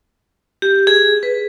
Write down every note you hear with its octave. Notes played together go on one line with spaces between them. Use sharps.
G4
G#4
B4